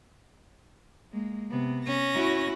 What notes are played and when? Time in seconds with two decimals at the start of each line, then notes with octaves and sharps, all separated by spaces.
1.12 G#3 A#3
1.51 C3 B3
1.84 C#4 A#6
2.14 E4 F#4